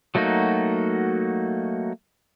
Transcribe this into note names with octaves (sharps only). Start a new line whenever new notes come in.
F#3 A3 A#3 D#4 F#4